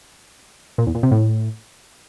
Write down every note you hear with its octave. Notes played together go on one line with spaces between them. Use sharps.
A#2
E2
A#2
C3
A2